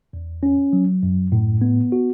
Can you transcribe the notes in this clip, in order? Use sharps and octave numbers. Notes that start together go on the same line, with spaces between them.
E2
C#4
F#3
F#2
A2
B3
F#4